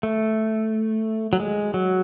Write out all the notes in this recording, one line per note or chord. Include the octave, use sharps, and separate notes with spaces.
A3
F#3
G#3
F#3